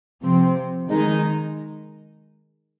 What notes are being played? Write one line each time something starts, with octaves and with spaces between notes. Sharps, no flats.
C3 F3 C4
D#3 G#3 D#4